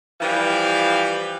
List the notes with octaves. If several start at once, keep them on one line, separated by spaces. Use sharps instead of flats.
E3 F3 G3 F5 G5